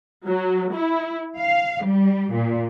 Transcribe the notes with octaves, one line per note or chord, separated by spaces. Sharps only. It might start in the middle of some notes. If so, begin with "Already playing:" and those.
F#3
E4
F5
G3
A#2